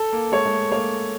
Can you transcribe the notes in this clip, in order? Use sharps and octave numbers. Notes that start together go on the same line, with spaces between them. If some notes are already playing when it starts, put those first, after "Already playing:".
Already playing: A4
A#3
G#3 C#5
G#3
A3
A#3 C#5